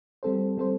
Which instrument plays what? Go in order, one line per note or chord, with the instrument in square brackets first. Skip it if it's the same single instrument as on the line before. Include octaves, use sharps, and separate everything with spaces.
[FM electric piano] G3 C4 A4 C5
G3 C4 A4 C5